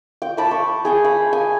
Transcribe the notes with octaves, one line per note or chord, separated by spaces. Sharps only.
G5
A5 B5 D6
C#6
G#4 G5 G#5
B5
G#5